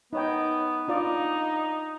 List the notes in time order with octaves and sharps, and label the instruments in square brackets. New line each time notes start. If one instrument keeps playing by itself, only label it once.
[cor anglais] B3 [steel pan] D#4 C#5 G5
[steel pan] D4 F4 D5 [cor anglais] D#4